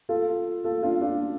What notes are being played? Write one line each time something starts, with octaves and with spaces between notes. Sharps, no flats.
F4 A4
F4 A4
D4 F4
D4 F4